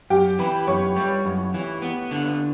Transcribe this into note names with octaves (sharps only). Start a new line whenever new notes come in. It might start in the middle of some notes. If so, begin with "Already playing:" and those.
F#2 G4 G5
E3 B4 B5
F#2 C#5 C#6
G3
F#2
E3
B3
D3